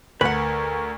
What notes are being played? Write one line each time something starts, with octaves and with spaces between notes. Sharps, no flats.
D2 A#4 B4 F#5